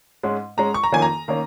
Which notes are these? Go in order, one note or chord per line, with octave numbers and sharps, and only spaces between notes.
G#2 G#3 C#4
G#2 G#3 C#4 A#5
C#6
A#5
F2 D#3 A#3 C#4 G#5
A#5
D#3 A#3 C#4